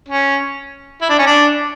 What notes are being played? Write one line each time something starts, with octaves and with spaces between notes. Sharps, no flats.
C#4
E4
D4
C#4
D4